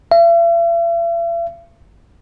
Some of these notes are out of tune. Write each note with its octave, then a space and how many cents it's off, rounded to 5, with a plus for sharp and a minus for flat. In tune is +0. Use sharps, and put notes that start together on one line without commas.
E5 +45